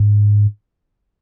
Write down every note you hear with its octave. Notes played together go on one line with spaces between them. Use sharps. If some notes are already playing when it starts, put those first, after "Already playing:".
Already playing: G#2